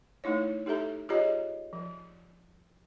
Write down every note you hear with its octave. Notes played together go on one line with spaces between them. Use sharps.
A3 D#4 E4 C#5
D#4 G4 A4 E5 A#5
F4 G4 G#4 C#5 D#5 A#5
F3